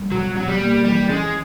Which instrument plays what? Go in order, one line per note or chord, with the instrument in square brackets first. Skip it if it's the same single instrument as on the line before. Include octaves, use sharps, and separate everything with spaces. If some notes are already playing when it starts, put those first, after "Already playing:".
Already playing: [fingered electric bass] G3
[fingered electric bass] B2 [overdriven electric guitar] F#3
[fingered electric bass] B2 [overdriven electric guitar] F#3
[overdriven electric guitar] G3
[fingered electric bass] A#3
[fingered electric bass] E3 [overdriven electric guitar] G3
[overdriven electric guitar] G#3 [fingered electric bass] C#4